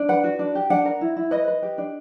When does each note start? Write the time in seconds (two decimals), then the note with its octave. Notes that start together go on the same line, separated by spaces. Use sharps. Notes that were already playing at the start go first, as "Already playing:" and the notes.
Already playing: D4
0.09 B4 F#5
0.24 F#4
0.39 D4
0.55 G4
0.70 D4 F#5
0.85 A#4
1.01 E4
1.16 E4
1.31 B4 D#5
1.48 B4
1.62 G4
1.78 D4